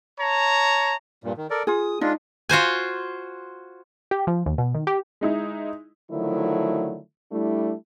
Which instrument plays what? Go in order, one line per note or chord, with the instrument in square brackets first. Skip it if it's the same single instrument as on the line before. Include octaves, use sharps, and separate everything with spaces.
[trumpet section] C#5 A5 A#5
[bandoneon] G2 A#2
D#3
A4 A#4 D5
[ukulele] F4 G#4 [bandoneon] D#6
[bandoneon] G#3 D4 F4 [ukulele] D#4
[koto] F4 F#4 C5 G#5
[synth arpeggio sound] G4
F3
D#2
B2
D#3
G4
[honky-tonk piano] G#3 D#4 E4
[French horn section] D3 D#3 F3 F#3 A3 E4
G3 A3 D4 E4